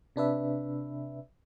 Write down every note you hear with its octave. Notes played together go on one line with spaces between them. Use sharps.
C3 D4 B4 E5